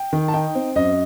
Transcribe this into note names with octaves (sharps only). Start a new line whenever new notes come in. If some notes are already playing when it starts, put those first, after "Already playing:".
Already playing: G5
D#3
A5
D#4 G5
C4
F#2 D#5